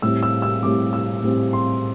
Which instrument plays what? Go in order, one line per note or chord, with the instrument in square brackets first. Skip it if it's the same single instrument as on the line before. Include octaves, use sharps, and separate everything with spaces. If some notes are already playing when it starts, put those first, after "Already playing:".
[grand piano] A2 G3 C4 E6
E6
E6
A2 G3 C4 D6
E6
A2 G3 C4
C6